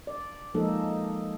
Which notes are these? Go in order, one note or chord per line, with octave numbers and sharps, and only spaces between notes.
D5
F3 G#3 A#3 D#4 A4